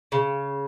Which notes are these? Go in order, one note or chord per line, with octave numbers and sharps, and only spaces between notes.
C#3